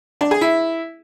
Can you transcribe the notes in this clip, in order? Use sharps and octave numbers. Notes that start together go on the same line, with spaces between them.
D4
G#4
E4